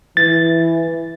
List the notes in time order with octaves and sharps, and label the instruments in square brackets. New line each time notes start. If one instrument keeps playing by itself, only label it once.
[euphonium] E3 [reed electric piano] A6